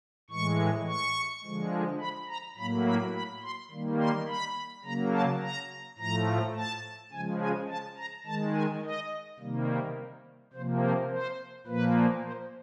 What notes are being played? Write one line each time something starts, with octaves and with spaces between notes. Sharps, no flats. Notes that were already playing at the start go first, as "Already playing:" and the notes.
A2 E3 G#3 C#6
C#6
D3 F3 G#3
B5
A#5
A2 F#3 A#3 B5
B5
B5
C6
D#3 G3 A#3
C6
B5
C#3 F#3 A#3 A#5
A5
A#5
A2 F3 A3 A#5
A5
C#3 F3 G#3 G#5
G#5
A5
A#5
D#3 G#3 A5
G#5
D#5
C3 D#3 G3 A#3
C3 F3 A#3 C5
C5
C5
A#2 F3 A#3 B4
C5